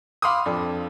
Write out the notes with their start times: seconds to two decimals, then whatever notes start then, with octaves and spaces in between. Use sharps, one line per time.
0.22 F5 B5 C6 D6 D#6
0.46 F2 D4 A4